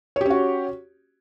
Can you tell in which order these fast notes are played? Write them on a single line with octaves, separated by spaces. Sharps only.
C#5 G4 C#4 F#4